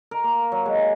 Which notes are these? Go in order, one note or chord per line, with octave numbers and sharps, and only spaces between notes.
A#4
A#3
F#3
G#3